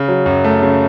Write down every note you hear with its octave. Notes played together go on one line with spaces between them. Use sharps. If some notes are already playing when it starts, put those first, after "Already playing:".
Already playing: C#3
F#3
F#2
A3
C#3